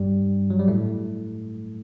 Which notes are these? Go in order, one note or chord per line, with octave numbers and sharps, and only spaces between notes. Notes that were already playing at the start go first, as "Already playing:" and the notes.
Already playing: G2 G3
F#3
G3
A2 A3